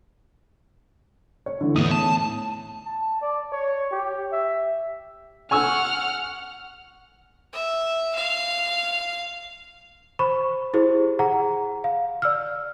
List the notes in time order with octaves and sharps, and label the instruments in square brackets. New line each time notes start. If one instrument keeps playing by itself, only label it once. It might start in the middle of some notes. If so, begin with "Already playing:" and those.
[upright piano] C#5
D3 E3
[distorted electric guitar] E2 B3 [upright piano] A2 D#6 D#7
[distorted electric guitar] A5
[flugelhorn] A5
D5
C#5
G4
E5
[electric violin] F#5 F6 [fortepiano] G#5 C#6 E6
[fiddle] E5
F5
[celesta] C5 B5 C#6
E4 G4 G#4 C5
G#4 F#5 A#5
F5
D5 E6 F6